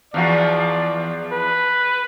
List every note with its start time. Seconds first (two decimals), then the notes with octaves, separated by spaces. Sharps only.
0.14 E2 F3 F#4 D5
1.32 B4